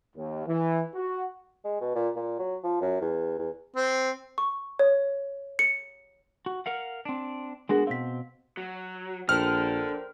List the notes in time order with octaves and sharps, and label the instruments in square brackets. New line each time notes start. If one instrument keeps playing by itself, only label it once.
[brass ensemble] D#2
E3
F#4
[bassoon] G#3
B2
A#2
A#2
F#3
F3
F#2
E2
E2
[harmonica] C4
[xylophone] C#6
C#5
C#7
[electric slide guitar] F#4
A#4 F5 F#5
C4 D4
[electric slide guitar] G#3 B3 F#4 [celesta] D4 G#4 A#4
[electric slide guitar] B2 C4 [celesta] F5 B6
[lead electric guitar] F#3
[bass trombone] A#1 [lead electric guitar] D4 A4 [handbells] A#4 C5 G5 [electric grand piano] F6